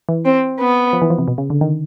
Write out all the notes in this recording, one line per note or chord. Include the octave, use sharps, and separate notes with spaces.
E3
C4
B3
F3
E3
F3
C3
B2
C#3
D3
D#3